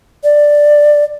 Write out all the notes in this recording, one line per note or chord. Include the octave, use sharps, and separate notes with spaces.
D5